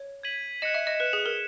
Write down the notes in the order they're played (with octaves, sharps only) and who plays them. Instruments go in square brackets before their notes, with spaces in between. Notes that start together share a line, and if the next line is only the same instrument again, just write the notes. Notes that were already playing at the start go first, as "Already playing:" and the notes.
Already playing: [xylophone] C#5
[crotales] G#6 B6 D#7 F#7
[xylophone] D#5 [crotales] F#6 C#7 E7
[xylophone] E5
D#5
[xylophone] B4 [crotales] F#6 C#7 E7
[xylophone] G#4
A#4